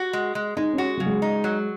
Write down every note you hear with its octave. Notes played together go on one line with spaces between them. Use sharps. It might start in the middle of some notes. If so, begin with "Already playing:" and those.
Already playing: F#4
G#3
G#3
G#3 D#4
C#4
F#4
C#3 F#3
G#3
D#4
F#3